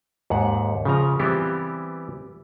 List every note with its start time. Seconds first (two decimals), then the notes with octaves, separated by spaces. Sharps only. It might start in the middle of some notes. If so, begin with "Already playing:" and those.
0.30 D#2 G#2 F#5
0.85 C#3 F3 A#5
1.20 E3 G3 B3 C4 E4 G4